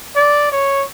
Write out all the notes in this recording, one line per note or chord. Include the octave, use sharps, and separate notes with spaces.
D5
C#5